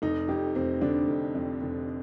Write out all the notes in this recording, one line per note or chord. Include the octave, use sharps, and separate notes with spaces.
F1 D#4
F2 G4
F1 C4
D3 D4
F1
F2
F1